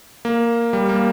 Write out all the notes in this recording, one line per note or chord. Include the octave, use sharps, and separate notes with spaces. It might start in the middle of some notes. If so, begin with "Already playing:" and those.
A#3
G3
A#3